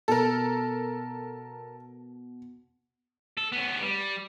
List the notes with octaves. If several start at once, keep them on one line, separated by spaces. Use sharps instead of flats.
B2 A4 A#4
A4
B3 C#4
G3